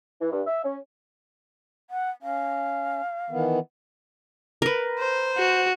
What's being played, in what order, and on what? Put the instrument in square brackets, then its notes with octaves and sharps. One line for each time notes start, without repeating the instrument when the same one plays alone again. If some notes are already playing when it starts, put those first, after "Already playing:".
[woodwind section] E3
G2
E5
C#4
[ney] F#5
[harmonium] C#4 [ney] F5
[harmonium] D#3 E3 B3
[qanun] A#4 B4
[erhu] C5
[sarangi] F#4